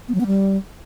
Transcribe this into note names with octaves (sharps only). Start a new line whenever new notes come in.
B3
F#3
B3
G3